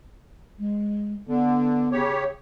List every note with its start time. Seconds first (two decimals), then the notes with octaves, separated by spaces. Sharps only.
0.59 G#3
1.28 D3 B3
1.92 C#3 G4 C#5